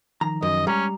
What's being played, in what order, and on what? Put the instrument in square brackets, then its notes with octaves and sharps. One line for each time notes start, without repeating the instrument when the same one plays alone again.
[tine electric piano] D#3 F3 D#4 [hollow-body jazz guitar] A#5
[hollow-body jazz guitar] F#2 [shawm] D#5
[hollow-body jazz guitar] G3 [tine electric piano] G#3 [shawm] C#4 [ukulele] A#5